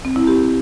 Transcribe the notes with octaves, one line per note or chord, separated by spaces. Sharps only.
C4
E4
G4